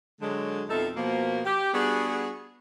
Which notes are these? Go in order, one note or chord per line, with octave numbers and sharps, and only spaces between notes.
D3 F#3 G#3
F2 B2 D#4 F4 A4 E5
B2 F3 A#3
G4
G3 B3 D4 F#4 G#4